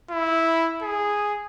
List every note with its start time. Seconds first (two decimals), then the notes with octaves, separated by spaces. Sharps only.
0.11 E4
0.83 G#4